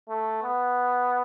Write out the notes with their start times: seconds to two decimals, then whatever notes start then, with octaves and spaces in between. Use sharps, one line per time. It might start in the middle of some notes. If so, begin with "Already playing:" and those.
0.09 A3
0.43 B3